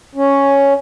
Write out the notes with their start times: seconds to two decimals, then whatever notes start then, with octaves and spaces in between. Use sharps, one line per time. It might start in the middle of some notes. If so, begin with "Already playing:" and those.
0.15 C#4